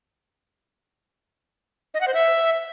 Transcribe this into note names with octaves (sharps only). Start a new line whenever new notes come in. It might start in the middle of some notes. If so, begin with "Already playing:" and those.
D#5
F#5
C5
E5